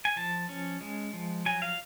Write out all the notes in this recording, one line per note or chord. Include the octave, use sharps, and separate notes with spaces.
G#5
F3 A5
C#4
G#3
F3
F#3 G#5
F5